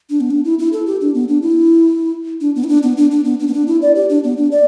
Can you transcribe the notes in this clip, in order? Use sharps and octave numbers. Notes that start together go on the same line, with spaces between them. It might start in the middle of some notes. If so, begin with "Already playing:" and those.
D4
B3
D4
E4
E4
A4
G4
D4
B3
D4
E4
D4
B3
E4
D4
B3
D4
D4
B3
D4
B3
D4
E4
D5
G4
D4
B3
D4
D5